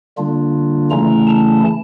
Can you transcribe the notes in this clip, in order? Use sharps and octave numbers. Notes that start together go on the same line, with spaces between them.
D3 G3 A#3 D4 F4
C#3 E3 A3 C#4 E4 A#5
A5